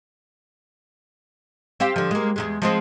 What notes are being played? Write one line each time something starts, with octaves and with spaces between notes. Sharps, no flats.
C4 G4 F5
D3 F3
G#3 A#3
E2 A#2 G#3
F3 G#3 C4